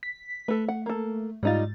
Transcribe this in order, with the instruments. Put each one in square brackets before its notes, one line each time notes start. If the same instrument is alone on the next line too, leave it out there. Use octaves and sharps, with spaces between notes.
[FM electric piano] B6
[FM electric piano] A3 [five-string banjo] A4 B4
[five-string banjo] F#5
A#3 A4
[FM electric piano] G#2 A6 [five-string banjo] G3 D#4 F4